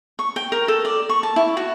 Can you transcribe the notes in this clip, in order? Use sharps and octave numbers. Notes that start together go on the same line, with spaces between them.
C#6
G5
A#4
A4
D5
C#6
A5
E4
F#4